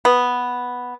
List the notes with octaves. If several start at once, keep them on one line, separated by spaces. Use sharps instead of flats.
B3